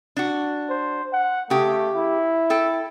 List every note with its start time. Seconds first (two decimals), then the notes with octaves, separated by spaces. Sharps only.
0.16 D4 F#4
0.69 C5
1.13 F#5
1.50 C#3 A3 G4
1.95 E4
2.50 A4 G5